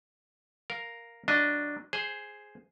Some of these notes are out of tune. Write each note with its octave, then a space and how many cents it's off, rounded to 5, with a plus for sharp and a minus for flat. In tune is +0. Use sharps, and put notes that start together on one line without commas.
A#4 +0 F5 +0
F#3 +0 D4 +0 D#5 +0
G#4 +0 C5 +0